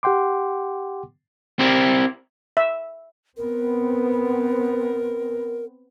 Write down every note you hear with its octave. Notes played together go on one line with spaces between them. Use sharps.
G4 F#5 G5 C6 D6
C4 E4 G4 A#4 C5 D5
E5
B3 C4 A#4